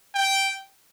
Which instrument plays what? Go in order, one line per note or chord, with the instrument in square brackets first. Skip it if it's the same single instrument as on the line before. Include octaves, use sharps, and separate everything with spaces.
[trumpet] G5